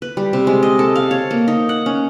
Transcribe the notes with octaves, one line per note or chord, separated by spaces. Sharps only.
B4
G3
C3
G#3
D#5
A4
F5
C#5
A#3
D#4
F#5
C#4